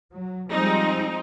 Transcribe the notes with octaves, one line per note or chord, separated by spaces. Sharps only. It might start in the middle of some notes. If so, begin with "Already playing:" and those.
F#3
F3 G3 G#3 C4 D#4